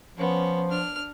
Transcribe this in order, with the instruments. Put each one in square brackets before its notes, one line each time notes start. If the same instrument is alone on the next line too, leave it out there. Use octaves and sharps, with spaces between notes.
[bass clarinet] F3 [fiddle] B3 C#4
[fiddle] D4 F6